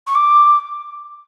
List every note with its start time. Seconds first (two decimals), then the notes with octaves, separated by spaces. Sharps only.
0.06 C#6
0.14 D6